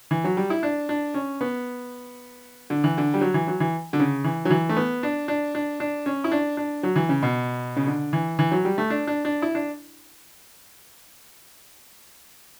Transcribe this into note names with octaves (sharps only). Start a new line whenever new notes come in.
E3
F#3
G3
E4
D4
D4
C#4
B3
D3
E3
D3
G3
F#3
E3
F#3
E3
D3
C#3
E3
F#3
E3
A3
B3
D4
D4
D4
D4
C#4
E4
D4
D4
F#3
E3
C#3
B2
C#3
D3
E3
E3
F#3
G3
A3
D4
D4
D4
E4
D4